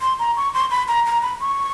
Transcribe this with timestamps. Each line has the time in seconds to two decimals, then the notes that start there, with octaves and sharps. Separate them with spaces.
0.02 C6
0.19 A#5
0.37 C#6
0.54 C6
0.71 B5
0.88 A#5
1.06 A#5
1.23 B5
1.41 C#6